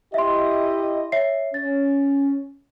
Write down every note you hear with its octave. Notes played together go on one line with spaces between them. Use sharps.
E4 G4 D#5 E5 C6
C#5 E5 C7
C#4 A6